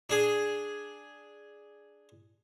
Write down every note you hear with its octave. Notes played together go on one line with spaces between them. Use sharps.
D4 G#4